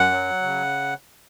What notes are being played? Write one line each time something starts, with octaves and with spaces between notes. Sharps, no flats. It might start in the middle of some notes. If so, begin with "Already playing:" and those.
Already playing: F#2 F#5
F#3
C#3